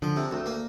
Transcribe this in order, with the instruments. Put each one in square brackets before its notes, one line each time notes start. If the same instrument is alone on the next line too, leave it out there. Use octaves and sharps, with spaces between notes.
[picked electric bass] D3 [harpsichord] F3
[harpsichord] C3
D2
A#3